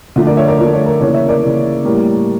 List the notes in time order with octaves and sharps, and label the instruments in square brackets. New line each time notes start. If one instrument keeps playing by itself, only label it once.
[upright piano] D3 F3 A3
A#4 D5
C#5 E5
A#4 D5
D3 F3 A3 A#4
C#5
A#4
C#3 E3 A#3 C#5
C#5 E5
A#4 D5
C#3 E3 A#3
A2 G3 A#3